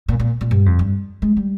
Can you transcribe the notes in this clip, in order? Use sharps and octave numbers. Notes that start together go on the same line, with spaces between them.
A#2
A#2
A#2
G2
F2
G2
G#3
G3